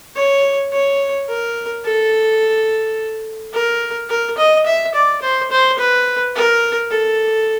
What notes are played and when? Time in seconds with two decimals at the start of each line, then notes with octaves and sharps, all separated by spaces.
0.16 C#5
0.72 C#5
1.29 A#4
1.85 A4
3.54 A#4
4.09 A#4
4.38 D#5
4.66 E5
4.95 D5
5.22 C5
5.51 C5
5.79 B4
6.35 A#4
6.91 A4